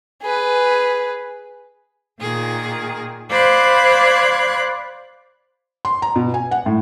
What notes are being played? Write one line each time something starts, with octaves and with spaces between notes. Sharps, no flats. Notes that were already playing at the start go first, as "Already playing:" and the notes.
G#4 B4
A#2 D#3 G#4
C5 D5 F5 B5 F#6 G#6
C6
A#5
B2
G#5
F#5
A2